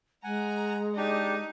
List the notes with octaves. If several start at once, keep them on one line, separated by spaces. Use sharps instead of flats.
G#3 F#5 G#5 A#5
D4 D#4 G4